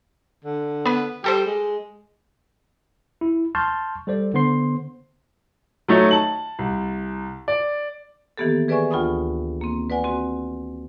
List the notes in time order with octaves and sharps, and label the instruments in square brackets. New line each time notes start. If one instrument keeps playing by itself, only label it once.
[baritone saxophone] D3
[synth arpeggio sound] B3 B4
[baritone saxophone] G3 [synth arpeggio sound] G4 A4 C5
[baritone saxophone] G#3
[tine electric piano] E4
A5 C6 C#6 F6 G6 A6
G3 A4 C5 D5
D3 B3 C5 C6 C7
[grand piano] F#3 A3 D#4 C#5
A5 F#7
C2
D5
[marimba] D#3 E3 A#3 B3 G4 A4
G#4 B4 D5 E5 G#5 C#6
D2 F4 G5 B5 C#6 D#6
A#3 C4
B4 D5 F#5 G#5
C4 F#4